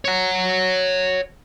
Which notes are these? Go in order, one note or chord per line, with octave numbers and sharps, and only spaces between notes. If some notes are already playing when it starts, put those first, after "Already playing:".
C#5 F#5